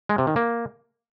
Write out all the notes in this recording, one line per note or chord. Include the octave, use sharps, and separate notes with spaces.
G#3
C3
D#3
A#3